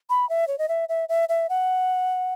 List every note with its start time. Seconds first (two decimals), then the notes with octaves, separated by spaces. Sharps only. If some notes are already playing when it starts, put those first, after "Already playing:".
0.10 B5
0.29 E5
0.48 C#5
0.58 D#5
0.68 E5
0.89 E5
1.09 E5
1.29 E5
1.49 F#5